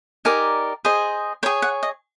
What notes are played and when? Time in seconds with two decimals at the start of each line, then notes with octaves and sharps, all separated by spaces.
0.25 D#4 G4 A#4 D5 G#5
0.85 G#4 C5 D#5
1.43 G#4 C#5 G5
1.62 F#5
1.83 D#5